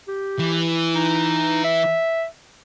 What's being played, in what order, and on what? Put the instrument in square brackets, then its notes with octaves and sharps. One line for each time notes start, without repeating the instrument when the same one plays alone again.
[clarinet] G4
[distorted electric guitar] E3
[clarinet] D#4
E5